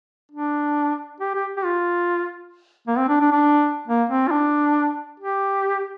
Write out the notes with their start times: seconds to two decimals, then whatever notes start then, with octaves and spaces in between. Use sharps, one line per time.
0.31 D4
1.20 G4
1.34 G4
1.57 G4
1.65 F4
2.87 A#3
2.97 C4
3.09 D4
3.21 D4
3.31 D4
3.87 A#3
4.09 C4
4.27 F4
4.31 D4
5.20 G4